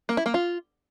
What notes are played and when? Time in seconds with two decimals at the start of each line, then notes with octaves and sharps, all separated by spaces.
0.09 A#3
0.17 E4
0.26 A#3
0.34 F4